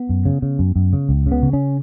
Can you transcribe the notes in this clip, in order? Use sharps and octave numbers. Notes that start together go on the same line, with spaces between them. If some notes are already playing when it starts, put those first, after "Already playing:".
Already playing: B3
F#2
C#3
C#3
F#2
F#2
C#3
C#2
C#3
B3
C#3
C#4